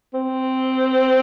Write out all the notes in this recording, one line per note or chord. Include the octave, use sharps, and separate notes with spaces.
C4